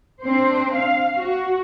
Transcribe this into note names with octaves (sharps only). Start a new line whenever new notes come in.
C4 D4 C5
F5
F#4